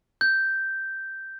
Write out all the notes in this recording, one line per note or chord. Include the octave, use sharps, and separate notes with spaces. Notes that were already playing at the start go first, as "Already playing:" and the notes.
G6